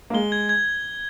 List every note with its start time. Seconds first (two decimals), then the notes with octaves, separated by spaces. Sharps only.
0.10 A#3
0.13 G#3 G7
0.32 G#6
0.49 G#6